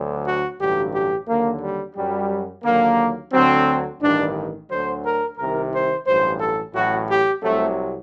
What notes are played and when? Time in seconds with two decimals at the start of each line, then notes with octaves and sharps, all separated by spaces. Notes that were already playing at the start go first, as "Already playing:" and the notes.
Already playing: D2 D3 F#3
0.26 F#4
0.59 A1 G2 D3 F#3 G4
0.93 G4
1.27 D#2 D3 F#3 A#3
1.62 G3
1.96 F#2 F#3 G3
2.64 D#2 D3 F#3 A#3
3.32 D2 D3 F#3 C4
4.01 A1 G2 D#3 D4
4.70 D2 D3 F#3 C5
5.04 A#4
5.38 C2 C3 D#3 A#4
5.73 C5
6.07 A1 G2 F#3 C5
6.40 A4
6.74 A1 A2 F#3 F#4
7.08 G4
7.42 C2 C3 F#3 A3